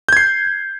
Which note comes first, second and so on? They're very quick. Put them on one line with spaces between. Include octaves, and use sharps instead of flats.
G6 G#6 C7